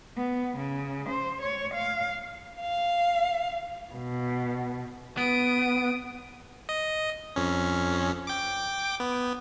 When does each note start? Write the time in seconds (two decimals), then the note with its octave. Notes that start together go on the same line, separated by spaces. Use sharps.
0.16 B3
0.57 C#3
1.09 C5
1.41 C#5
1.74 F5
2.59 F5
3.93 B2
5.17 B3 D#6 D7
6.69 D#5
7.36 F2 C#4
8.27 G5 D6
9.00 B3